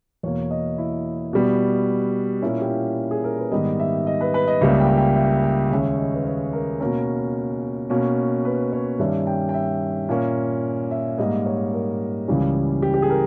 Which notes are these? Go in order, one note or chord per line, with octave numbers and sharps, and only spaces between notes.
E2 B2 A#3 C#5
D#5
E4
B2 G3 B3
A#2 A#3 C#4 E4
G4
E4
G#4
A#4
B4
G#2 D#3 G3 B3 D#5
E5
D#5
B4
B4
D#5
C#2 C#3 G3 A#3 E5
G5
G5
E5
G5
D#2 C#3 G#3 C#4 E5
D#5
B4
C#5
A#4
B2 A#3 C#4 A#4
B2 A#3 C#4
B4
C#5
G2 D#3 G3 C#4 E5
G5
G5
E5
A#2 A#3 C#4
E5
G#2 G3 A#3 D#5
C#5
A#4
C#2 C#3 E3 G3 C#4
G4
G4
G#4
A#4